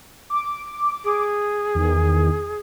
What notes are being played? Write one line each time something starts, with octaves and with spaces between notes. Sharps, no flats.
D6
G#4
E2 D#3